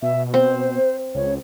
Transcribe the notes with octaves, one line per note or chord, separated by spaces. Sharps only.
B2 E5
C4 C5
C#2 C#5